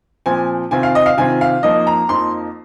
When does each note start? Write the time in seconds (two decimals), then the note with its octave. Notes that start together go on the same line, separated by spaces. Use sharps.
0.26 A#2 F3 C4 G#5
0.71 C3 D#3 C4 F4 G#5
0.83 F5
0.95 D#5
1.06 F5
1.17 C3 D#3 C4 F4 G#5
1.41 F5
1.63 F2 F3 A#3 D#4 D#5
1.87 A#5
2.09 F2 F3 A#3 D#4 C6